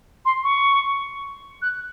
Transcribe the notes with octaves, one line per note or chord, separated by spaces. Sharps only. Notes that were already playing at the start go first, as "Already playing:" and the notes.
C6
C#6
F#6